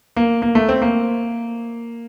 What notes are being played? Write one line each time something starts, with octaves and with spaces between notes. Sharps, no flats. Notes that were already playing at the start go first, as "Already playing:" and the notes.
A#3
A#3
A3
C4
A#3